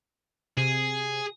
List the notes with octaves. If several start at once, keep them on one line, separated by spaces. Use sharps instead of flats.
C3 G#4